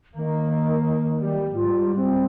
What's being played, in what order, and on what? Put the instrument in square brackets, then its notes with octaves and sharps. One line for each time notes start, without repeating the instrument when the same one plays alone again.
[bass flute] D#3 [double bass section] A#3
[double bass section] G3
[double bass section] G#2 G3 [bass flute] F4
[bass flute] C4